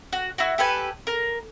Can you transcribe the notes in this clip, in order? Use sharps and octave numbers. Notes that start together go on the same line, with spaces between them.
F#4
E4 F#4
G4 A4 B4 G#5
A#4